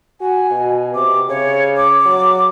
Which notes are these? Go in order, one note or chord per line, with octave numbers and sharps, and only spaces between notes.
F#4 G#5
B2
C3 D6
C#3 C#5
D6
F#3